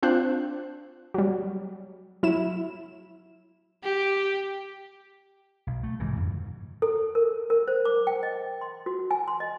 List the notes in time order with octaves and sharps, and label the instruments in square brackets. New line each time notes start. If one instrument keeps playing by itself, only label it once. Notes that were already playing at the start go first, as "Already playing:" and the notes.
[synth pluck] C4 D4 F4 C5 F#6
F#3 G3
F#3 E4 E7
[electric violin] G4
[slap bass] B1
A3
G#2 C3 D#3 E3
F2 G#2 D3
[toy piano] A4
A#4
A#4
C5
D6
G5
D#5
C6
F#4
G#5
C6
D#5